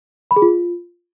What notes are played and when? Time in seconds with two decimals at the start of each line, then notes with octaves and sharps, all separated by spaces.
0.31 B5
0.36 G#4
0.42 F4